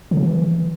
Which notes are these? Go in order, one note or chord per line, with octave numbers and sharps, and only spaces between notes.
D3
C#3
E3